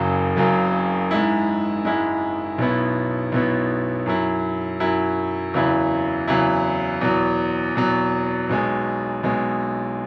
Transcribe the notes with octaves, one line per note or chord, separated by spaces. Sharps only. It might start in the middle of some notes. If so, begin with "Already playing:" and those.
Already playing: F#1 F#2 C#3 F#3
F#1 F#2 C#3 F#3
G#2 G#3 E4
G#2 G#3 E4
B1 B2 B3 E4
B1 B2 B3 E4
F#2 F#3 E4
F#2 F#3 E4
E2 C#3 F#3 E4
E2 C#3 F#3 E4
E2 B2 F#3
E2 B2 F#3
B1 B2 G#3
B1 B2 G#3